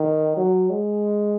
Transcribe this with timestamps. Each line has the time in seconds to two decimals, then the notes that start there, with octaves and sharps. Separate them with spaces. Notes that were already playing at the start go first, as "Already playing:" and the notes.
Already playing: D#3
0.37 F#3
0.70 G#3